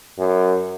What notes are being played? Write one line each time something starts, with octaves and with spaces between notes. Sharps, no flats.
F#2